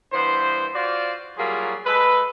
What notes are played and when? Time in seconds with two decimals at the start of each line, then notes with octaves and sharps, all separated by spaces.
0.13 G2 E3 B3 C5
0.74 F4 F#4 C5 D5
1.37 F#3 G3 A#3 F4 G#4
1.86 G#3 A4 B4